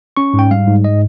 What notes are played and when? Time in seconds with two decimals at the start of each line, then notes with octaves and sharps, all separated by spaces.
0.17 C#4 C#6
0.34 G#2
0.39 G5
0.51 G3 F5
0.68 G#2
0.84 D#5